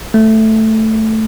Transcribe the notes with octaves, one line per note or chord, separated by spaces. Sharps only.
A3